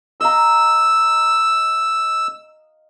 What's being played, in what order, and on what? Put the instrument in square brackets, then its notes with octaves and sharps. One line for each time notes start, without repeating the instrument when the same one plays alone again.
[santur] D#5 F5 A#5 [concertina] E6